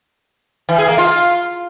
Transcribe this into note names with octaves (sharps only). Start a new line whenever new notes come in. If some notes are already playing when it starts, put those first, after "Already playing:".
E3
G#4
A#3
F4